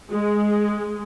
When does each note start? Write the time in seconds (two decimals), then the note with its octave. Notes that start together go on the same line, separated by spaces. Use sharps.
0.11 G#3